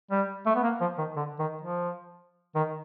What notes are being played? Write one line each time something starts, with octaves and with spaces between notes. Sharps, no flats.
G3
A3
B3
A#3
F3
D#3
D3
D#3
F3
D#3